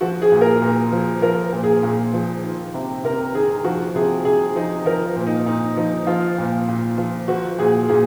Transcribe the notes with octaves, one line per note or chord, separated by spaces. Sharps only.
F3 F#4
G#4
A#2
A#4
A#2
F3
F3 A#4
A#2
G#4
A#2
F3
D#3
C3
C3 A#4
D#3 G#4
F3 F#4
C3 G#4
C3 G#4
F3 D#4
F3 A#4
A#2
D#4
A#2 D#4
F3 D#4
F3 F4
A#2
A#2
F3
F3 F#4
A#2 G#4
A#2 G#4